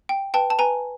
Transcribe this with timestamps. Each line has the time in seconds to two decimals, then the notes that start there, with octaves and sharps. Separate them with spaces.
0.09 G5
0.34 B4 G5 A5
0.50 A5
0.59 B4 G#5 A#5